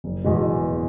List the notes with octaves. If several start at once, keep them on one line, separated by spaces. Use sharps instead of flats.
F#1
E2 B2 G#3